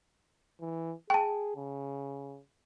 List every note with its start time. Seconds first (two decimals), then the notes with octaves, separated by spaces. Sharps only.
0.61 E3
1.10 G#4 G5 A5
1.56 C#3